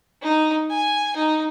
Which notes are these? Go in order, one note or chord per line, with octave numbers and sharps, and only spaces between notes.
D#4
G#5
D#4